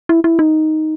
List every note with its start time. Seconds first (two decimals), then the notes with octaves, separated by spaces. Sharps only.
0.09 E4
0.24 E4
0.39 D#4